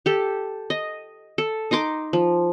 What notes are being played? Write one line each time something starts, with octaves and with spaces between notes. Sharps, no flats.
G4 A4
D#5
A4
D#4 A#5 C6 D6
F3